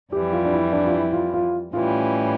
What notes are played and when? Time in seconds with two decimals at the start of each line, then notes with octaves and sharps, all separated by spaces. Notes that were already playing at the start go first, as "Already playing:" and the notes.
0.12 F2 E3 G3 G4
0.33 F4
0.45 D4
0.53 E4
0.72 D4
0.86 F4
0.93 E4
1.13 F4
1.33 F4
1.73 A2 E3 G3 C#4 F4